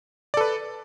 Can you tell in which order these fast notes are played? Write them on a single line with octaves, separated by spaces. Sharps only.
D5 A4 B4